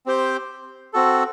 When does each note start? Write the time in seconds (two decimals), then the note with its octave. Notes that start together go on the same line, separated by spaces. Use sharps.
0.06 C4 G4 C5 G5
0.93 C4 F#4 A4